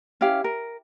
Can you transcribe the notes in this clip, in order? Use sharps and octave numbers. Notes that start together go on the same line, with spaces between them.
C#4 E4 G4 F5
A#4